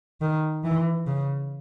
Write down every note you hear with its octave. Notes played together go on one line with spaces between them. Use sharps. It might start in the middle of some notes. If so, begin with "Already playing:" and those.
D#3
E3
C#3